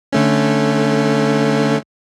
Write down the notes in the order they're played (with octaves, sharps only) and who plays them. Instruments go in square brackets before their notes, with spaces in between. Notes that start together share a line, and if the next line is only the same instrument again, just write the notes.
[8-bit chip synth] D3 A3 C#4